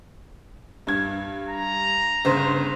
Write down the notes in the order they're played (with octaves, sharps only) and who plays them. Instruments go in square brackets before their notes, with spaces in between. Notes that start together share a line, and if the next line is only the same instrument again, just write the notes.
[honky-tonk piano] G2 G#6
[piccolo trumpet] A#5
[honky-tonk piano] G1 C#3 C5